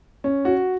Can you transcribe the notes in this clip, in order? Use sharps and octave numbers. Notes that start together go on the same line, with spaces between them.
C#4
F#4